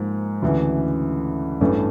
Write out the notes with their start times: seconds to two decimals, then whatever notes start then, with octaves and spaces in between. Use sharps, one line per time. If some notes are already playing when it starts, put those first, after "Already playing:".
Already playing: G#2 F3 A#3
0.42 D2 C#3 E3
1.61 A1 G2 E3 A3